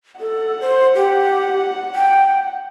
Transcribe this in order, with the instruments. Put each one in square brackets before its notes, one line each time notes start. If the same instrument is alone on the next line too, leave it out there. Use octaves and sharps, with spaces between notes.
[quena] A4 [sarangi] F#5
[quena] C5
G4
G5